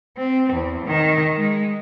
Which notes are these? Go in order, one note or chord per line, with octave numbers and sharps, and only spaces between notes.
C4
E2
D#3
G#3